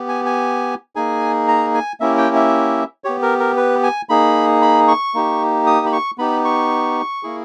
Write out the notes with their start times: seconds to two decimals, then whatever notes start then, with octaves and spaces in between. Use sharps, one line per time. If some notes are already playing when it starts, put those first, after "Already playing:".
Already playing: B3 G4
0.08 G#5
0.26 G#5
0.96 A#3 D#4 G#4 G#5
1.48 A#5
1.74 G#5
2.00 A#3 C#4 E4 G4 E5
2.17 G5
2.36 E5
3.04 B3 G4 C#5
3.22 A#4
3.39 A#4
3.57 B4
3.83 G#5
4.09 A#3 D#4 G#4 B5
4.62 B5
4.88 C#6
5.14 A#3 D#4 G4
5.66 D#6
5.86 B5
5.93 C#6
6.18 B3 D#4 G4 B5
6.45 C#6
7.23 A#3 E4 G#4